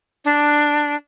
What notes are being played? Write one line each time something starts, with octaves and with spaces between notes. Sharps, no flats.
D4